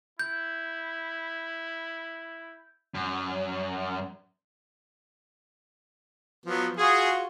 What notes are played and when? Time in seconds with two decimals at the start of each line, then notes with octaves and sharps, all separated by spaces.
0.19 E4 G6
2.94 F#2
6.46 F3 F#3 B3
6.77 F4 F#4 G#4